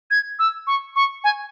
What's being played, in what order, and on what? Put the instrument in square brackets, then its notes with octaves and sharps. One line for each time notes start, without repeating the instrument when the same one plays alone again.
[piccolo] G#6
E6
C#6
C#6
G#5